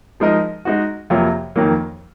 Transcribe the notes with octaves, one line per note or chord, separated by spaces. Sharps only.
F3 G#3 D#4 A#4 D#5
G#3 D#4 F#4
F2 C3 F#3 A#3 F4
F2 D#3 F#3 A#3